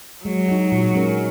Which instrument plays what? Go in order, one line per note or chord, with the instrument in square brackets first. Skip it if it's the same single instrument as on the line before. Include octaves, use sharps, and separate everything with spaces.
[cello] F#3 [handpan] G#3
[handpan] D#4 F#4
A#2
G#3 C#4 A#4